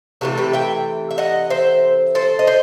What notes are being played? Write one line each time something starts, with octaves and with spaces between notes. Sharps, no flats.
C3 E3 A3 F#4 A4
G4 B4
E5 G5
E5
D#5 F#5
C5 E5
A4 C5
D#5
C5